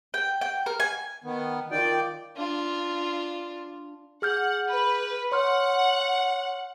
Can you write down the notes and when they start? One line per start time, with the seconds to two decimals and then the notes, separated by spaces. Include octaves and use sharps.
0.14 G5
0.41 G5
0.66 A#4
0.80 G#5
1.24 D#3 B3
1.71 D#3 F4 D5 G5
2.36 D4 F4
4.22 G#4 F#5 F6 G6
4.68 B4
5.32 C#5 F#5 C6 F6